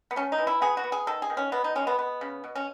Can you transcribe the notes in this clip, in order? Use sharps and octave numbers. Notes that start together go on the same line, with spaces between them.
B3
A3 C#4
D#4
E3
E4
B3 G#4
F#4
B3
G#4
D#3 A4
G#4
D#3
C#4
B2 B3
D#4
G#3 C#4
B3
B3
C#3
B2
C#4